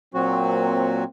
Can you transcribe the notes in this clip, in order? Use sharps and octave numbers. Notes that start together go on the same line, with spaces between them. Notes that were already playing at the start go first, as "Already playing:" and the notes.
A#2 F#3 A#3 C4 F#4